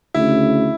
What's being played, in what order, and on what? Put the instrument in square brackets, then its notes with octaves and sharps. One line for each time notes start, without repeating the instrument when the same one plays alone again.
[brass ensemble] D2 C#3 [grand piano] E4